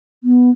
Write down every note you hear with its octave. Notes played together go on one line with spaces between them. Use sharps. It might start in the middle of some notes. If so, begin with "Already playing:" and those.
B3